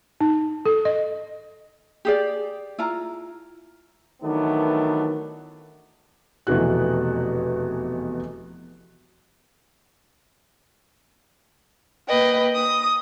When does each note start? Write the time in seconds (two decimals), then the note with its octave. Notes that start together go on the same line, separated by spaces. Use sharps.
0.21 D#4
0.66 A4
0.85 D#5
2.05 G4 G#4 D5
2.78 E4 F4 A#5
4.23 D#3 E3 F#3 A3 B3 D4
6.47 F1 E2 B2 E3 F#4 F#6
12.08 A#3 B4 D#5 G5
12.54 D#6